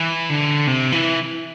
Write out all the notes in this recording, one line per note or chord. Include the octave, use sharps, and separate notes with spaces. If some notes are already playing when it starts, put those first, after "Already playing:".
Already playing: E3
D3
C3
E3